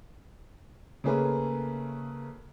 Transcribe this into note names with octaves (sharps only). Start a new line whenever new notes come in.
C#3 A3 A#3 G#4 B4